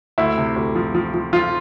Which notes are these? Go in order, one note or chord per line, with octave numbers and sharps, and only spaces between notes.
D2 E4
C3
D2
F3
F3
F3
F3 F4